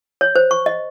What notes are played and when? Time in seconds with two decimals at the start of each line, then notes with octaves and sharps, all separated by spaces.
0.21 C#5
0.36 C5
0.51 C#6
0.66 D#5